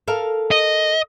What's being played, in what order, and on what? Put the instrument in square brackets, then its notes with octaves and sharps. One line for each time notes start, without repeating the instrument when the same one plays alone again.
[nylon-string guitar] A4 A#4 F5
[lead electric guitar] D#5